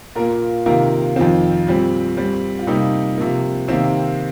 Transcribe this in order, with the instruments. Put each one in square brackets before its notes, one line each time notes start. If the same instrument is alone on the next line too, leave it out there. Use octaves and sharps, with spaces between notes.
[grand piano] A#2 A#3 F4 A#4
C3 D#3 A#3 F4 A#4
F2 D#3 C4 F4
A#2 G3 C4
A#2 G3 C4
F4
C3 G3 A#3 D#4
C3 F3 A#3
C3 D#3 A#3 C4